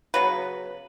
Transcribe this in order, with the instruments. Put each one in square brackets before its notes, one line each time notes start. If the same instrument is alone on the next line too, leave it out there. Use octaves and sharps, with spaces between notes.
[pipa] C#3 F#3 B3 B4